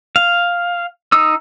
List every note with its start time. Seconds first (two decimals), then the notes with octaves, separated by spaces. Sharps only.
0.16 F5
1.12 D#4 D#6 E6